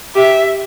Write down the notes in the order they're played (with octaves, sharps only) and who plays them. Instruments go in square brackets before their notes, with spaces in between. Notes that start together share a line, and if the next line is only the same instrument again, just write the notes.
[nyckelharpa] G4 [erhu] E5